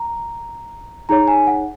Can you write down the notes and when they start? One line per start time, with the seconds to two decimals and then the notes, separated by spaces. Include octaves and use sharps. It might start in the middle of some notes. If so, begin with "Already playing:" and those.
Already playing: A#5
1.09 D#4 G#4 C#5 A#5
1.28 G#5
1.47 F#5